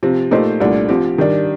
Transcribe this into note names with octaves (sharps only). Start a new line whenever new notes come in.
C3 F3 C4
A#2 A3 D#4 G4 C5
C2 A#2 A3 D4
F3 C4 G4
D#3 G3 D4